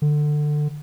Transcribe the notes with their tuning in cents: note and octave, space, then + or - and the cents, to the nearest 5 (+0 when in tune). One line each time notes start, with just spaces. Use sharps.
D3 +20